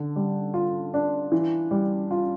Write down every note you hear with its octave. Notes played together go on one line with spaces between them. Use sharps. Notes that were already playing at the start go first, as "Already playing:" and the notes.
Already playing: D3
G3
F4
D4
E3
G3
F4